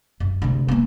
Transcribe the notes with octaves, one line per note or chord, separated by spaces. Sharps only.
F#2
D2 C3
A#3 B3